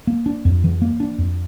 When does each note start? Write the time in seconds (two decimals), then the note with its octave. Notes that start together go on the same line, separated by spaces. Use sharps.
0.07 A#3
0.26 D4
0.45 F2
0.64 E3
0.82 A#3
1.00 D4
1.18 F2